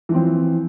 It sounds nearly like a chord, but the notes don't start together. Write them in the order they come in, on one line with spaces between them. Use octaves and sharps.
E3 F3 C4